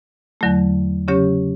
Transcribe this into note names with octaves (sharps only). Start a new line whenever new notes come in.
E2 D3 F#3 A3
C#3 F#3 C#4 G4 C#5